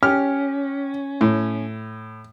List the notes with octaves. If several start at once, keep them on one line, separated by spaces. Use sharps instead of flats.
C#4 G4 F6
A2